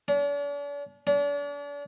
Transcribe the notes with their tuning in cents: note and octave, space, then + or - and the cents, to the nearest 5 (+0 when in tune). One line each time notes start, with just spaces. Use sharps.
D4 -45
D4 -40